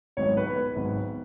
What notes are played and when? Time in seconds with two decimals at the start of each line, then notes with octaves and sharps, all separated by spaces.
0.17 G#1 G#2 F#3 B3 C#5
0.37 B4
0.56 B4
0.76 G#1 G#2 F#3 B3